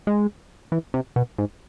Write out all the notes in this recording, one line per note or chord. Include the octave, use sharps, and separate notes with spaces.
G#3
E3
C3
B2
G#2